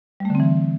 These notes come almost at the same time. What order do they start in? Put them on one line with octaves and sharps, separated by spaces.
G3 A3 D3 C4 E3